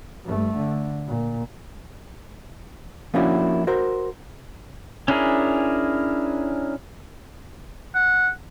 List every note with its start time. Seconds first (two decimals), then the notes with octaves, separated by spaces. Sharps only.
0.24 G2 A3
0.56 D3
1.08 A#2
3.14 F3 A#3 C#4 D4 E4 F#4
3.67 F#4 A#4 C5
5.08 C#4 D4 E4 G#4 A#4
7.95 F#5